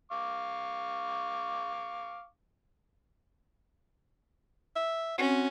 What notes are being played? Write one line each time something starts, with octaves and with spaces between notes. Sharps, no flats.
F5 C#6 D6
E5
C4 C#4 F#4